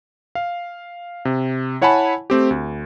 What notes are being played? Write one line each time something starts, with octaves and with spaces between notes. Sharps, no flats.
F5
C3
E4 C#5 F#5 G#5 A5 B5
A3 C4 G4
D2